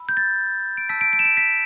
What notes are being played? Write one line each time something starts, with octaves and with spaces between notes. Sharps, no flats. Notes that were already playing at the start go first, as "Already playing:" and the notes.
Already playing: B5 E6
G6
A6
D7
A5 E6 G6 B6
D7
D7
E7
D7
B6